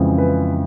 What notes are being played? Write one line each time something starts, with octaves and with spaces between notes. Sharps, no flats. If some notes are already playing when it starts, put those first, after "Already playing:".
Already playing: F2 C#3 E3 G#3
B4